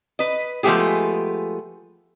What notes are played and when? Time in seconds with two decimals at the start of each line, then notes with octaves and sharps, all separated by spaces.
0.19 B4 D#5
0.63 F3 G#3 A3 B3 G4 G#4